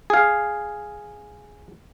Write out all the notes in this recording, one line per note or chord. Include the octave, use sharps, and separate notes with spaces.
G#4 F5